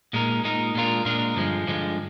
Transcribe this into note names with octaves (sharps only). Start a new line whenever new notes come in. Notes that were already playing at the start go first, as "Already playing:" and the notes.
A#2 G#3 D#4 A#4
A#2 G#3 D#4 A#4
A#2 G#3 D4 F4 A#4
A#2 G#3 D4 F4 A#4
G2 D3 F3 G#3
G2 D3 F3 G#3